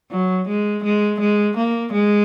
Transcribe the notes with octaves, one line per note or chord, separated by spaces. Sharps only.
F#3
G#3
G#3
G#3
A#3
G#3